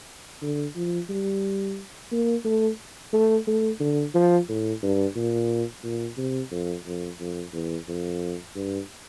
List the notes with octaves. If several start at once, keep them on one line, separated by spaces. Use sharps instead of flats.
D3
F3
G3
A#3
A3
A3
A3
D3
F3
A2
G2
A#2
A#2
C3
F2
F2
F2
E2
F2
G2